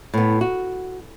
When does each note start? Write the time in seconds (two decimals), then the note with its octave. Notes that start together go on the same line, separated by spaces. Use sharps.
0.14 A2 B3
0.41 F#4